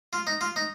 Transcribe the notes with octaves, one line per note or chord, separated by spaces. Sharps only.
F4
D#4
F4
D#4